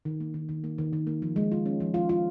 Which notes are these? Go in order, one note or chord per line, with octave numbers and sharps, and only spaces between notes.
D#3
A#3
D#3
D#3
A#3
D#3
D#3
A#3
F3
G#3
F4
C#4
F3
F4
F4